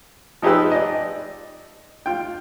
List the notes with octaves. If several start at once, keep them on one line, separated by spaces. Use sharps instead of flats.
F3 D#4 G4 G#4 B4 E6
D5 D#5
F4 G5